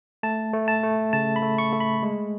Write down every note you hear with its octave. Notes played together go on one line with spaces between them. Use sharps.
A3 A5
A3
A5
A3
C#3 A5
B5
A3
C#6
A3
B5
G#3